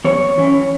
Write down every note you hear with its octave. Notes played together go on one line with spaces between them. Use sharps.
E2 C#5
E3 C#4 E4